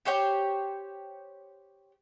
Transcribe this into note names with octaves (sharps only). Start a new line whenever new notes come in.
G4 C5 C#5 G5